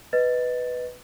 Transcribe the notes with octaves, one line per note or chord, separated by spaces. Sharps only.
B4 D#5 A6